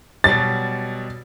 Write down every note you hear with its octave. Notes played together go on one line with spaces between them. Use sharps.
B2 F#3 G3 A6